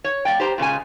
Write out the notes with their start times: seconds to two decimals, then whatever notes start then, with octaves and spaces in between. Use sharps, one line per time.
0.04 C#5
0.25 A#3 D5 G5
0.40 G4 C5 A#5
0.58 A#2 C#3 G#3 G#5